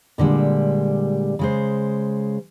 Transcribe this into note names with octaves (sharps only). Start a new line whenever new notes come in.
A#2 D3 G3 G#3
C#3 G#3 C5